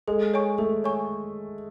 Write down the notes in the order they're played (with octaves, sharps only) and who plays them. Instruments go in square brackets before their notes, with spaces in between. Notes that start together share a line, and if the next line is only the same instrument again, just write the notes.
[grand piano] G#3 [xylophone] A4
[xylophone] C#5 G#5 C#6
[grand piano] A3 [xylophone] A4
[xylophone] C#5 G#5 C#6